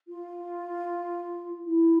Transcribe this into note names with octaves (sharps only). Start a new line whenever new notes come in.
F4
E4